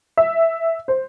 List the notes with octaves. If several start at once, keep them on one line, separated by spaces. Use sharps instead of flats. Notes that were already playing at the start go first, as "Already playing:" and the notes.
E5
C5